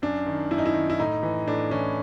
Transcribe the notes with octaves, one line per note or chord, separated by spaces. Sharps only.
F#2 D4
D#3
F#2 E4
D#4
E4
D#3
E4
A2 D#4
E3
A2 D4
E3 C#4